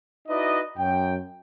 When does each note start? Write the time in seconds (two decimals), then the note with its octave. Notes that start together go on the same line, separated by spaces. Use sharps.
0.28 D#4 E4 F#4 B4 D5 D#5
0.78 F#2 G5